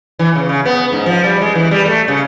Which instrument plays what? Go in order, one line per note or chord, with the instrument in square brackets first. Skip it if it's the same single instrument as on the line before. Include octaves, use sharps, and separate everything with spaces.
[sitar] E3
C#3
C#3
B3
G#2
F3
G3
G#3
E3
G3
A3
C#3